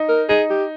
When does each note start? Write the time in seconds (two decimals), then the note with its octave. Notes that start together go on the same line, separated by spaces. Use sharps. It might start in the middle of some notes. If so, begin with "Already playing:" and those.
Already playing: D#4
0.08 A#4
0.28 D#4 G#4
0.50 G4